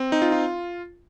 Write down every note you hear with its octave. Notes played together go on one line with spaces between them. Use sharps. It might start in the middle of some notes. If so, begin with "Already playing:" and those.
Already playing: C4
D#4
F4
F4